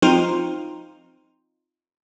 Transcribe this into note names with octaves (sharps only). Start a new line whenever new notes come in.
F3 C4 D#4 F4